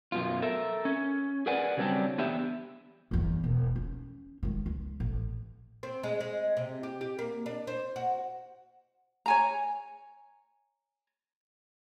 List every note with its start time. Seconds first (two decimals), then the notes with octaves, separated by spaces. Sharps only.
0.12 F#2 B2 F4
0.42 A4 A#4 E5
0.85 C#4
1.46 G#4 A#4 B4 D5 F#5 G#5
1.77 C#3 F#3 G3 C4 D4 G4
2.18 E2 B3 D4 G4 E5
3.11 G1 E2
3.44 E1
3.76 C#4
4.43 D#3 G#3
4.66 C#2
5.00 A1
5.83 C4
6.03 G#3
6.20 G#3
6.57 C3
6.83 G4
7.01 G4
7.19 A#3
7.46 D4
7.67 C5
7.96 F#4
9.26 C#5 G#5 A#5